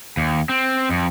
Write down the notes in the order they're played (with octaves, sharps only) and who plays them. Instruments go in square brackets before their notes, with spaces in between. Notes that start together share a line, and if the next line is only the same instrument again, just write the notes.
[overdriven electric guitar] D#2
C4
F2